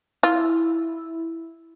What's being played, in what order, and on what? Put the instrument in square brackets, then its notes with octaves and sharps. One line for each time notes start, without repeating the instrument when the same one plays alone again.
[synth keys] E4 [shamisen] F4